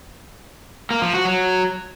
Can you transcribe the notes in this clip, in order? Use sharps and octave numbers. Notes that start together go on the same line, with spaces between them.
A#3
F3
F#4
F#3